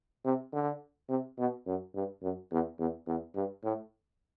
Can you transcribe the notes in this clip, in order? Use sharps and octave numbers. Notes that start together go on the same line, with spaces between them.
C3
D3
C3
B2
F#2
G2
F#2
E2
E2
E2
G2
A2